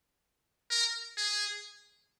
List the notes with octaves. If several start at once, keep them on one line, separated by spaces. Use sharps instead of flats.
A#4
G#4